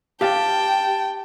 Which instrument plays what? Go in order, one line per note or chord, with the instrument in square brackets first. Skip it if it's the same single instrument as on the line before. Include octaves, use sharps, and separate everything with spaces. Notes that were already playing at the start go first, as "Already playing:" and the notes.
[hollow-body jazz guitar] G4 F5 [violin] G5 [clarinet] A5